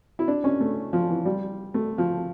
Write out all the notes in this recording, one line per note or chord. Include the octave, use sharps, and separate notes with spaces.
E4
D4
C#4
A3
F3
E3
G3
A3
F3